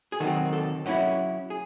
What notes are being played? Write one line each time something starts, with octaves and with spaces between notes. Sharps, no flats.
G#4
D#3 F#3 C4 A4
A4
F#3 C#4 E4
G#4